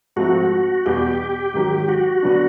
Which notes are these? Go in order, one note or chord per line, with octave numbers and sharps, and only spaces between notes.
G#2 F3 A3 C4 F#4
E2 B2 G3 B3 G4
G#2 D#3 F#3
F#4
D3 F#3 B3 D4